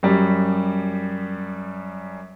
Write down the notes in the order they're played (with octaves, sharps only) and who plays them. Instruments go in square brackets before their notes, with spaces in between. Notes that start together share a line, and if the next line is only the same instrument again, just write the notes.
[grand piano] F#2 G3